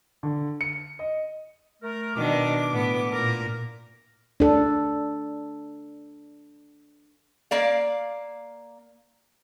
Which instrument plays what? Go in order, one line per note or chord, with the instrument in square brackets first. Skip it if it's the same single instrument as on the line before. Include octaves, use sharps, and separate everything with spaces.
[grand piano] D3
C#7
D#5
[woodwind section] A3 A#4
[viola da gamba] B2 D#3 D4 [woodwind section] D6
[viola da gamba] A2 B3
A#2 A#4
[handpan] D4 A4
[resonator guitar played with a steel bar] A#3 D5 F5